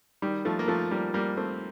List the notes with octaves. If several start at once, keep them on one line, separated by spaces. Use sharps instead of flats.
D#3 G3
F3 A3
A#3
F3 A3
G3 A#3
G3 A#3
A3 C4